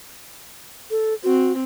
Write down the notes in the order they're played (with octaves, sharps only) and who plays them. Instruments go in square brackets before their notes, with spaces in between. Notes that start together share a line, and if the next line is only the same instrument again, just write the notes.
[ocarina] A4
[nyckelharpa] C4 [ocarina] F#4